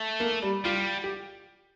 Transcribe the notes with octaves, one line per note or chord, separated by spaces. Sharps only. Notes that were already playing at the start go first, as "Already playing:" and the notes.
Already playing: A3
A#3
G3
G3 F4
G4